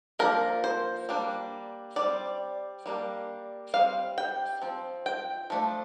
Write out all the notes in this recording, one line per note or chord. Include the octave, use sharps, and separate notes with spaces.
F3 A#3 D4 A#4
C5
G3 A#3 D4
G3 C4 D5
G3 A#3 D4
G3 C4 F5
G5
F3 C4
G5
F3 A3 D4